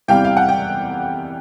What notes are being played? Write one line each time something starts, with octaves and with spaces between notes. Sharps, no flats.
E2 C3 E3 G3 F5 G5
F5
F#5
G5